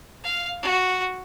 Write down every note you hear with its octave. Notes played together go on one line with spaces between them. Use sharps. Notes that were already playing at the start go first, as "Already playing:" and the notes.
F5
F#4